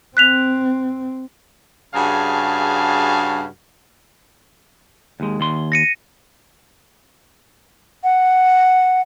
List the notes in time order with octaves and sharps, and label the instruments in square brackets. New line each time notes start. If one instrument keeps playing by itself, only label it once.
[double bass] C4 [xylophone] F#6 B6 F7
[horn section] G2 C#3 F#4 G#4 F5 A5
[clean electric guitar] D#2 G#3
D#2 C6
[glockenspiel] A#6 C#7 D#7
[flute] F#5